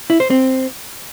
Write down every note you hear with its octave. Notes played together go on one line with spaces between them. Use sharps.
E4
C5
C4